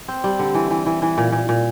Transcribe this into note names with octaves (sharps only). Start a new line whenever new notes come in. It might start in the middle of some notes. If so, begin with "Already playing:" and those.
C4
G3
D3
E3
E3
E3
E3
A#2
A#2
A#2